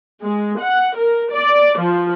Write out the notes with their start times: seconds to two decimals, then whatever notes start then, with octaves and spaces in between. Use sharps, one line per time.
0.22 G#3
0.60 F#5
0.97 A#4
1.32 D5
1.79 F3